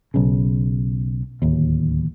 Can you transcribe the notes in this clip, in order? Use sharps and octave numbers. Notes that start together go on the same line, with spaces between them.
B1 C#3
D1 D#2